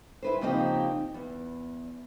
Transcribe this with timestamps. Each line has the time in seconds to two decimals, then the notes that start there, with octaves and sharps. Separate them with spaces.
0.23 E4 B4 C5
0.41 C#3 F3 A#3 C4 D#4 G4
1.14 E2